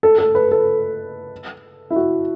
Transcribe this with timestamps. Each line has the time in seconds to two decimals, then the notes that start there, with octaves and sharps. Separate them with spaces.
0.03 A4
0.18 A4
0.35 B4
0.51 A4
1.90 E4
1.96 F#4